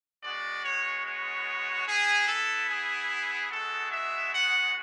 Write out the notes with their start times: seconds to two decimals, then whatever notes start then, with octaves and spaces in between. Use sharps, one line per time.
0.23 G#3 B3 F#4 D5
0.63 C#5
1.05 C#5
1.86 B3 E4 G#4
2.27 A4
2.68 G#4
3.50 G#3 B3 F#4 A4
3.91 E5
4.32 F#5